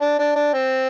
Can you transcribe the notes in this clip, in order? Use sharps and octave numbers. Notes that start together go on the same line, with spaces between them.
D4
D4
D4
C4